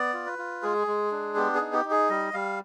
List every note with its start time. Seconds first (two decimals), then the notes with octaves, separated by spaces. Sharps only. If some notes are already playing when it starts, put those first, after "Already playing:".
Already playing: B3 D5
0.14 F4
0.26 B4
0.39 F4
0.63 G#3 G#4
0.87 G#3
1.12 D4
1.35 B3 G4
1.55 G#4
1.60 D#4
1.73 G4
1.85 D#4
1.91 G#4
2.10 G3 D#5
2.34 G3 F5